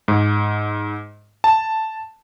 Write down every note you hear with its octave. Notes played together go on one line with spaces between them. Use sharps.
G#2
A5